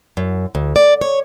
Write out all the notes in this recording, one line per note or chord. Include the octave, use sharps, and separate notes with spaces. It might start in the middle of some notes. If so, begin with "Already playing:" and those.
F#2
D2
D5
C#5